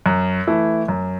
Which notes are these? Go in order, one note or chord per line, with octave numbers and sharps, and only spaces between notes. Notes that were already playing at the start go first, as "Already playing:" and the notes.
F#2
E3 A3 E4
F#2